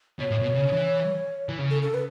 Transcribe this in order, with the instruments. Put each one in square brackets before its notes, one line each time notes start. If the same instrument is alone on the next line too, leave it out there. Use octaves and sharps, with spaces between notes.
[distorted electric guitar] B2 [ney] C#5
[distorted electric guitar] A2
B2
C#3
E3
E3
C#3
[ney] A4
A4
B4